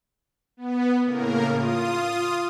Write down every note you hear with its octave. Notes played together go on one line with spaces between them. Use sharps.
B3
A2 C#3 A#3 A#4
F4 D#6